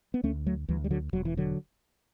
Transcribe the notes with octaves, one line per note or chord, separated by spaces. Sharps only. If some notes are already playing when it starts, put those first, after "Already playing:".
B3
D2 A3 C#4
F#3 A3
D2 E3 G3
G3
D3 F#3
E1 F#3
E3
D3 F#3